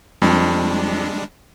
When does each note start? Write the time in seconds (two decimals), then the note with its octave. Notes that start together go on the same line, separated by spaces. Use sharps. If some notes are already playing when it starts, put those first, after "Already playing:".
0.22 F2 G3 G#3 D4